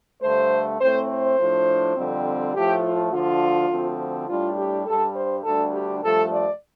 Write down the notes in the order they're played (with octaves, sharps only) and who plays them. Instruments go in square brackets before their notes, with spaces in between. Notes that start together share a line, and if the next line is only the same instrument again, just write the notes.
[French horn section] G2 D3 A3 C5
A2 A3 C4 C5
C5
A2 F3 D4
F2 D3 G3 C4
A2 F3 A3 G4
F4
D2 D3 F3 D4 F4
D2 D3 F3 C4
A2 G3 D4 F4
G4
G2 G3 D4 A4
C5
D2 D3 G3 D4 A4
G4
G2 F3 A3 A4
D5